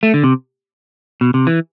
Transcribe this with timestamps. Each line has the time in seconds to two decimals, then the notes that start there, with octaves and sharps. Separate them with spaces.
0.03 A3
0.14 D3
0.24 C3
1.21 B2
1.34 C3
1.47 E3